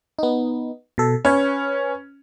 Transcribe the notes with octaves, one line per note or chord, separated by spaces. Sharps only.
B3 D#4
B2 A4
C#4 B4 C#5